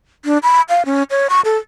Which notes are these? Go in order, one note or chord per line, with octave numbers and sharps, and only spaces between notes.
D4
B5
F5
C#4
C#5
C#6
A4